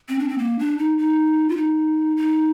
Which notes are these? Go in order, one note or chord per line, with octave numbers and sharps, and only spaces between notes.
C4
D4
C4
A#3
D4
D#4
D#4
F4
D#4
D#4